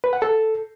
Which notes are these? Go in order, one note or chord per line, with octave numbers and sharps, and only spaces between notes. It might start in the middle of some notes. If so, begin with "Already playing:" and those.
B4
F#5
A4